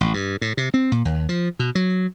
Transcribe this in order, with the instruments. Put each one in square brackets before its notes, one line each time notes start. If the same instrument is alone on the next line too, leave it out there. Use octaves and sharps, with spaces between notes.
[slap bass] A1
G2
A2
C3
C4
A#2
D#2
F3
B2
F#3